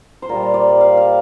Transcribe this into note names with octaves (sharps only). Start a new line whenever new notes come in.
C5
A#2 G3 A#4
D5
F5
F5